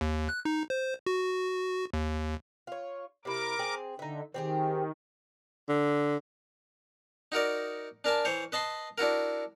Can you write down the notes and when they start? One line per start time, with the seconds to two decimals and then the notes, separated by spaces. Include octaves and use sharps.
0.01 D#2
0.29 F#6
0.45 D#4
0.70 C5
1.06 F#4
1.93 D#2
2.67 F4 C#5
3.25 C3 E4 A#4 D6
3.59 C4 G#4
3.99 D3 D#4 E5
4.34 D#3 C4 G4 G#4
5.69 D3
7.32 D#4 F#4 A#4 D5
8.04 D4 A#4 G#5 A5
8.25 E3 C5 C#5
8.52 B4 D#5 A5 B5 C6
8.98 D4 E4 F#4 A#4